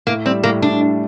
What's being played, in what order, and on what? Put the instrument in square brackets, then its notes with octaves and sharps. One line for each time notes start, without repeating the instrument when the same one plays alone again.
[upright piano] A2 [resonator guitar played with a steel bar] A#3
[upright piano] G3 [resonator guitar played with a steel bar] C4
[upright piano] A2 [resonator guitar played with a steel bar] A#3
[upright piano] A2 [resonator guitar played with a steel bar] D4
[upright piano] D4